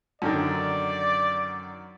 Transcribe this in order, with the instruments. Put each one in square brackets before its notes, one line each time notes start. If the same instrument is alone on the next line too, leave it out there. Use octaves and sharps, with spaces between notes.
[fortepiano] F#2 D3 D#3 [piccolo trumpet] D5